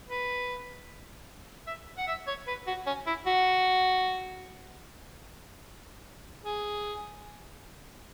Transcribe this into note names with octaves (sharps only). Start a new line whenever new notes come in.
B4
E5
F#5
E5
C#5
B4
F#4
C#4
E4
F#4
G#4